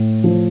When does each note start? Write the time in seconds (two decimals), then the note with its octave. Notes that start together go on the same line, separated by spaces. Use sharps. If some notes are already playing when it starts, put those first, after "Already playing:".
Already playing: A2
0.24 F3